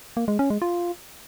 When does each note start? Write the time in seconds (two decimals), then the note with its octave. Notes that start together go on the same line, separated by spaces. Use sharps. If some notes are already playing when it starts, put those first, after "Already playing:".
0.17 A#3
0.28 G#3
0.39 C#4
0.50 G#3
0.62 F4